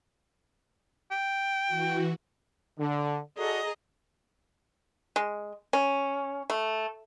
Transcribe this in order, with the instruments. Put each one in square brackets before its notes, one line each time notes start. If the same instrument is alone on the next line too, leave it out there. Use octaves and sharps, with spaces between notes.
[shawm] G5
[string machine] E3 F#4
[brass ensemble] D3
[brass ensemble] F#4 A4 D5 [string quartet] G#4 D#5 A#5
[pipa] G#3
C#4
A3